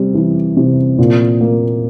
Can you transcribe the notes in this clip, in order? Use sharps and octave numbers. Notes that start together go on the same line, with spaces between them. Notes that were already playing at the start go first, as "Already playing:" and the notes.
Already playing: C3 G3
E3
C3
A#2
A#3